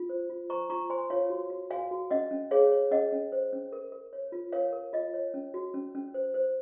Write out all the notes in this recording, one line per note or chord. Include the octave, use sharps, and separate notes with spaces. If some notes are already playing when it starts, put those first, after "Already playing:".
Already playing: F4
C5
F4
C5 A#5 C#6
F4 A#5 C#6
C5 G#5 C6
F4 C#5 F5
F#4
F#4
F#4 F5 G#5
F#4
C#4 D#5 F#5
C#4
G#4 C#5 F5
C#5
C#4 D#5 F#5
C#4
C5
C#4
A#4
A#4
C#5
F4
A#4 C#5 F5
A#4
F4 D#5
C#5
C#4
F#4
C#4
C#4
C5
C5